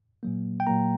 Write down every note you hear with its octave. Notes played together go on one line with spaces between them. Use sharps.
A#2 F#3 A#3
G5
A#2 F#3 A#3 A#5